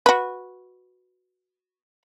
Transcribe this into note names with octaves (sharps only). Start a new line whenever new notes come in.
F#4 B4